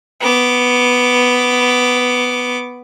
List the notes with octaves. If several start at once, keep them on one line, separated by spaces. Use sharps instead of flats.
B3 D6